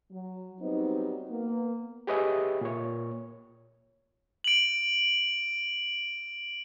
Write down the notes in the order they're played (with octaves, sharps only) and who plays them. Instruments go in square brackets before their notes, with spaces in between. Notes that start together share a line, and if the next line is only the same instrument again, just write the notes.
[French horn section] F#3
F#3 G3 B3 C4 D#4
A#3 B3
[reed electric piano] G4 G#4 B4 C#5 D#5 E5
A#2 C#5
[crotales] D7 F#7